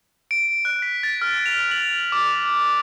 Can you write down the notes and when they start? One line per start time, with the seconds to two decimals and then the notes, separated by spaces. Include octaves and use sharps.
0.31 D7
0.65 F#6
0.82 B6
1.03 A6
1.22 F6
1.46 F7
1.71 F#7
2.12 D6